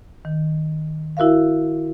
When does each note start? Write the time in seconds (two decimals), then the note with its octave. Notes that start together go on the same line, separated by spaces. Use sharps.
0.25 D#3
1.17 E4 F#4 A#4 E5 F5